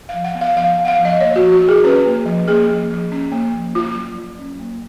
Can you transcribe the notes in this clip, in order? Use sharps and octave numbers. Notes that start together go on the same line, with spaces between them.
F3 F5
F#5
B3
F5
F3 F5
B3
F#5
F5
F3
D#5
A#3 C#5
F#4
F3
F#4
F3
G#4
C#4 B4
A#3
F3
A#3 G#4
F3
F3
C#4
A#3
F3
A#3 F4
F#3
F#3
C#4
A#3